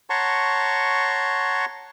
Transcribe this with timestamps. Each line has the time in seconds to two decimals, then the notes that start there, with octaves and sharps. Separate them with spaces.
0.10 C#5 F#5 A5 A#5 C6 C#6